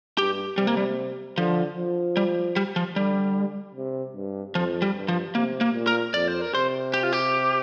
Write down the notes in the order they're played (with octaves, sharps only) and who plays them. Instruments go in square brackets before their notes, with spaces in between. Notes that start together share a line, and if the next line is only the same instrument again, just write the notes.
[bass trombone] G2 [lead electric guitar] G4
[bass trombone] C3 [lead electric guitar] G3
[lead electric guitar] A#3
G3
[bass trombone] D3 [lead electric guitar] F3
[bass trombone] F3
[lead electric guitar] G3
G3
F3
[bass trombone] D3 [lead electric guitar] G3
[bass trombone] C3
G2
[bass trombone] F2 [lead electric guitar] F3
[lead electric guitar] G3
[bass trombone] G2
[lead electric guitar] F3
[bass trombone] C3 [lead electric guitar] A#3
[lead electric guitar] A#3
[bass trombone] A#2
[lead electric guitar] A#4
[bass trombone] F2 [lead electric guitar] D5
[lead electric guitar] C5
A#4
[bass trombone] C3 [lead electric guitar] C5
[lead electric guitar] G4
F4
G4